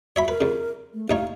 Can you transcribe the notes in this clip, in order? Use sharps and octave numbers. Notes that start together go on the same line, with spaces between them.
F#4 C#5 E5 B5
A#4 B4
F2 C#3
A3
A1 D#4 C#5 F5